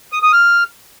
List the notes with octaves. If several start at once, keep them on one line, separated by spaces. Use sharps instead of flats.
D#6
D#6
F6